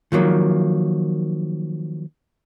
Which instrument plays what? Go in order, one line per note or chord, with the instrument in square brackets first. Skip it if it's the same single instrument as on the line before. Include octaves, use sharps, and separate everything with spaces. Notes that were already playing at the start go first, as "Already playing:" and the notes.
[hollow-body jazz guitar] D#3 F3 F#3 A#3